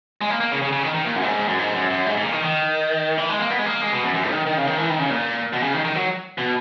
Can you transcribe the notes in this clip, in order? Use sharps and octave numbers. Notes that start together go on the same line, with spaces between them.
G#3
A#3
A#3
C#3
C#3
C#3
D#3
D#3
A#2
F#2
A#2
G#2
F#2
G#2
F#2
F#2
G#2
G#2
A#2
D#3
D#3
E3
G#3
A#3
B3
G#3
A#3
G#3
B2
F#2
F#2
D#3
D#3
C#3
D#3
E3
D#3
C#3
A#2
B2
C#3
D#3
D#3
F#3
B2